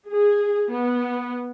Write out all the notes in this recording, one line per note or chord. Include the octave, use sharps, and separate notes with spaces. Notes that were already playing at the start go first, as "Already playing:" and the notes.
G#4
B3